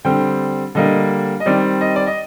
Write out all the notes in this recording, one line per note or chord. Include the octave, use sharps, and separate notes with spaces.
D3 G3 C4 G5
D3 G3 A#3 D#5
D#5
D#3 G3 C4 D5
D#5
D5
D#5